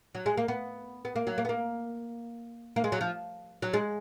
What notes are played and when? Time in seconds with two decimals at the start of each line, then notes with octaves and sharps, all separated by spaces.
0.15 F#3
0.26 G#3
0.37 A#3
0.48 B3
1.05 B3
1.16 A#3
1.27 F#3
1.38 A#3
1.45 B3
1.49 A#3
2.76 A#3
2.84 G#3
2.92 F#3
3.01 F3
3.62 F#3
3.73 G#3